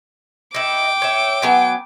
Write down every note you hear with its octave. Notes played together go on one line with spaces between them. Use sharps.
D#4 E4 G5 D6
C#5 E5
F#3 B3 G#5